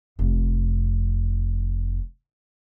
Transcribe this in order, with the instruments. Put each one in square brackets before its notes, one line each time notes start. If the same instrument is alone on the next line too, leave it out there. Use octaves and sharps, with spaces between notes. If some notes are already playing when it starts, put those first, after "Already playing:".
[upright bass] F1 F2